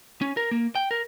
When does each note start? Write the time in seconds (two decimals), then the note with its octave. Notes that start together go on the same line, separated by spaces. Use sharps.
0.21 C#4
0.37 A#4
0.51 A#3
0.75 G5
0.91 A#4